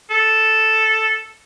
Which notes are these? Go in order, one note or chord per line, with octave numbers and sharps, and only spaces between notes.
A4